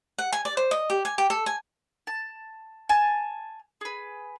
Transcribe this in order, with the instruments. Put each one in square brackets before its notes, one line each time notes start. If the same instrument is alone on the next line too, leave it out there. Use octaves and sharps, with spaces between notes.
[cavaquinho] F#5
G#5
D5
C5
D#5
G4
G#5
G4
A4
G#5
[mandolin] A5
G#5 A5
G#4 B4